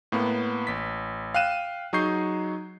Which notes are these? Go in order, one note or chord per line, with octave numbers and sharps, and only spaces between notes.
A2 A#3 B3
A1 B6
F5 G5 F#6 D#7 E7
F#3 D#4 G#4 C#6 G6 C7